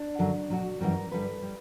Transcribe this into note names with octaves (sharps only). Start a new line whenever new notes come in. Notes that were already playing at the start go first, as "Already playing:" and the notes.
Already playing: D4
F#2 D3 F#3
B2 F#3 F#4
F#2 E3 G3 A#4
G2 D3 G3 B4
G3